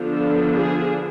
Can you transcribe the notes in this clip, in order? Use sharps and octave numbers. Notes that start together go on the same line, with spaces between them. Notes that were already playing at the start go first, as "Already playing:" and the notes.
Already playing: D3 F3 B3 D4
A4
G#4